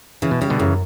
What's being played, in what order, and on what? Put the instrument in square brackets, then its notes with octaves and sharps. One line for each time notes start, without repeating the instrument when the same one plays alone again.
[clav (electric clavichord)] C#3 [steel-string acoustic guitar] E3
[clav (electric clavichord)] B2
[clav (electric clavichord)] C#3 [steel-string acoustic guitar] G3
[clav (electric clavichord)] B2 D3
[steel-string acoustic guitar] F#2 [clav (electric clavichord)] C#3 E3